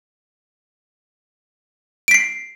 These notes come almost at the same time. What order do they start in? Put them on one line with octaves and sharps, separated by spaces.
D7 B6 C7